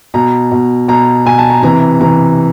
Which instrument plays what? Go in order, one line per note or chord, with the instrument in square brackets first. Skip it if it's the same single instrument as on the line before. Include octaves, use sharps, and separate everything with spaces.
[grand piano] B2 A#5
B2
B2 A#5
B2 G#5
A5
A#5
C3 E3 A#5
C3 E3 A#5